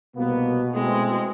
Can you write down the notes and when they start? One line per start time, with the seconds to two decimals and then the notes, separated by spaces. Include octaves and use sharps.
0.17 C2 B2 A#3 B3
0.75 G#3 A3 C4 E4